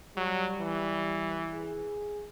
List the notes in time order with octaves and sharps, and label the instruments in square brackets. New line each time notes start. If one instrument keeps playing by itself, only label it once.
[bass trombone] F#3 [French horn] G3
[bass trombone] E3
[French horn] G#4